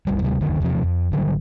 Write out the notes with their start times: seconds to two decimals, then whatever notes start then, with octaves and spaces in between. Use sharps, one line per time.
0.07 F#1 C2 G3
0.22 D2 C3 F#3 G3
0.41 F#1 D2 D#3
0.60 E2 C3 F3
0.83 F2
1.12 G#1 D3 F#3 G3